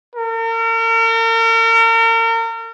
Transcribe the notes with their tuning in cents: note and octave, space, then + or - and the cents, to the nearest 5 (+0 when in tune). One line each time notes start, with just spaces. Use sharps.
A#4 -40